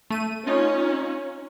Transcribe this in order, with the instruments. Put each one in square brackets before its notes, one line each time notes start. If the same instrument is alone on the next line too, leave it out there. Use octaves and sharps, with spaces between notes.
[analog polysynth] A3 D#7
[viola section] C#4 [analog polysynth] D#4 F4